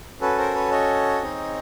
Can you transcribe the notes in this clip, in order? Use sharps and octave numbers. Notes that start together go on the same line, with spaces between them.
C#4 F#4 A4 B4
A#4 C5
B4 C#5
C#5 D#5
C4 D#4 G#4